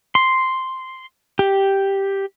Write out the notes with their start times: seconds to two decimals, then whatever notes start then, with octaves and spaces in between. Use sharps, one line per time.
0.15 C6
1.39 G4